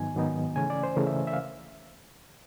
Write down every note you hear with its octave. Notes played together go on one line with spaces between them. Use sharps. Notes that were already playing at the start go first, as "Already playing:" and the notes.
Already playing: G#2 D#3 F#3 B3 D#4 G#5
G#2 D#3 F#3 B3 D#4
C#3 E3 A3 C#4 G#5
D5
C5
C#3 E3 A3 C#4 A#4
E5
E5
F5